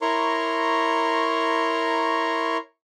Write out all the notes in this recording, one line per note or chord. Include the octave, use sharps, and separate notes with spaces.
E4 A#4 C#5 A#5 C6 C#6